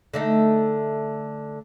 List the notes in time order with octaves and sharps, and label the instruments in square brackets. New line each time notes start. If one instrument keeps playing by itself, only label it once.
[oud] D3 A3 D#4